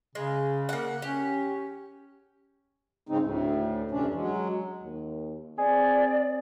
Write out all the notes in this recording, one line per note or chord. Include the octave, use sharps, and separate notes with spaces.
C#3 G#3
A#3 F#5
C#4 G4
G#2 C#3 G#3 C4 D#4
D2 A2
F2 C3 E3 C#4 D4
F#3 G#3
D#2
C4 G#4 D5